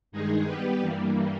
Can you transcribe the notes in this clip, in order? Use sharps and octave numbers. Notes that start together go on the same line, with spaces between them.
G2 D#3 G#3 D#4 G#4
G3 B3 G4 B4
G2 E3 G3 A#3